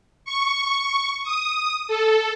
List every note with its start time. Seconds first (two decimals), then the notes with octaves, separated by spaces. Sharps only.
0.25 C#6
1.24 D#6
1.88 A4